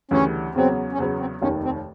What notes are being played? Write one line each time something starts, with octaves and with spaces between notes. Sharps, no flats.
D2 C#3 E3 G3 C#4
E2 C#3 F#3 B3 C4
C#4
E2 C#3 F#3 B3 C4
C4
F1 D#2 D#3 C#4
C4